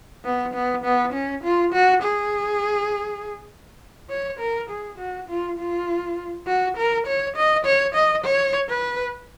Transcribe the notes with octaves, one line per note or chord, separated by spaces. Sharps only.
B3
B3
B3
C#4
F4
F#4
G#4
C#5
A#4
G#4
F#4
F4
F4
F#4
A#4
C#5
D#5
C#5
D#5
C#5
B4